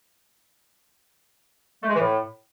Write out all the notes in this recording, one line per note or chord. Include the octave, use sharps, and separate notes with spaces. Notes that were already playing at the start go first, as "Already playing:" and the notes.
A3
G#3
E3
A2